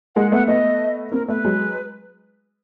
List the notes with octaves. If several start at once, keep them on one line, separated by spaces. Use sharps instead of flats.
G#3 A#3 F#5
A3 B3 F#5
A3 B3 D#5
A#3 C4 A#4
A3 B3 B4
F#3 G#3